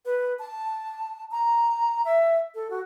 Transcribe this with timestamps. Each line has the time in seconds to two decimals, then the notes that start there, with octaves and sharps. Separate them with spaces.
0.05 B4
0.39 A5
1.31 A#5
2.05 E5
2.55 A4
2.70 F#4